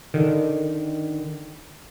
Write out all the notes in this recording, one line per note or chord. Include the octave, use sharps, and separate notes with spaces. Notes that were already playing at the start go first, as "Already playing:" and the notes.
D3 D#3